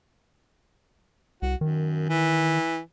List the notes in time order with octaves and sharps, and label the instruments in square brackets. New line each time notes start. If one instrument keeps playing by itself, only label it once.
[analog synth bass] C2 [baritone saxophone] F#4
[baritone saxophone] F#2 [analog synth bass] D#3
[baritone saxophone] E3